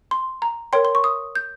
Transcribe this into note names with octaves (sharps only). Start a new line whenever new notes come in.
C6
A#5
A#4 C#5 G5 C6
C6
C#6
D#6
G6